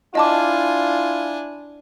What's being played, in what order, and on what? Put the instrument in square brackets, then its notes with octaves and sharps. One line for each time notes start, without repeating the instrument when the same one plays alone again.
[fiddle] D4 G#5 [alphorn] E4 [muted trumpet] F4 [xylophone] D#5 A5 D6